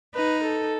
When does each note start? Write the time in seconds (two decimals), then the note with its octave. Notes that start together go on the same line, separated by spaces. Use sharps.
0.15 D#4 B4
0.43 A4